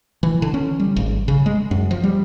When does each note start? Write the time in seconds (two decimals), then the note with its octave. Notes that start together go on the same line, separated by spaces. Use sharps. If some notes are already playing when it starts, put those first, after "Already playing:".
0.23 E3
0.42 D3
0.54 C#4
0.80 G3
0.96 G#1
1.28 C#3
1.46 G#3
1.71 F#2
1.91 F3
2.04 G3